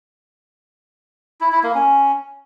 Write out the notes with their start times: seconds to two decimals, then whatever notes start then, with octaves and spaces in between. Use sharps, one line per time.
1.41 E4
1.52 E4
1.63 A#3
1.75 C#4